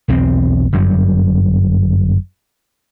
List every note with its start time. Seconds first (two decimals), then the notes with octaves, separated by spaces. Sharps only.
0.08 B1 E2 C4
0.73 G1 F#2 F#3 G3